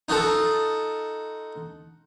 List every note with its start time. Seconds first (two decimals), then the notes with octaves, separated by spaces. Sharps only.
0.09 D#4 F4 F#4 A4